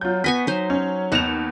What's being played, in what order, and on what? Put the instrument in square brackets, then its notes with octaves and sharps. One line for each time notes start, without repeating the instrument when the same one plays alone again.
[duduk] F#3 [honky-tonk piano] F4 G6
[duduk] B3 [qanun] D#5 G#5 C#6 [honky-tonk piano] B6
[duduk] F#3 [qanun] D#4 C5
[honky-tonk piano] C#4
[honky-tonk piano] D#2 E7 F7 [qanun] B3 F#5 A#5